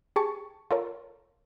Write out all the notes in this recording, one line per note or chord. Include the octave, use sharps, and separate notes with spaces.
G4 G#4 A5 C#6
F4 A4 A#4 C#5